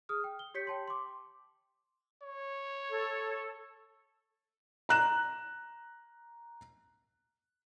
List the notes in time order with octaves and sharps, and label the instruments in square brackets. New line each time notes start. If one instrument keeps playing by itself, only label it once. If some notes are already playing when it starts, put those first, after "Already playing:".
[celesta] G#4 D#6 F6
G5
G7
G4 C#5 G6 B6 C#7
G5 A5 C6
C6 D6
[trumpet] C#5
[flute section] A4
[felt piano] A#5 F#6 E7